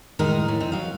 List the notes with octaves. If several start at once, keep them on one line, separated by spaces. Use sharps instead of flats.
A2 D#3 G#3 D#4 A#4
A2
C4 D#4
F#3 F5